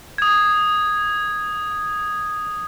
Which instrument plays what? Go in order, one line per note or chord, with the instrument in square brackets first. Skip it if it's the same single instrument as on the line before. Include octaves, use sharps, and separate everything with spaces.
[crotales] D#6 G#6